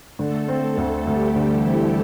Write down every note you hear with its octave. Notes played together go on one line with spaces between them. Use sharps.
D3 A3 A4
C4
D2
D2 G3 G4
D3
E3 E4
C4